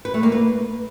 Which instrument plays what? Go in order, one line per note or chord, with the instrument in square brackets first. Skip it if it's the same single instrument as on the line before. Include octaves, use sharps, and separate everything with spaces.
[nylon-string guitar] B4
A3
A#3
B4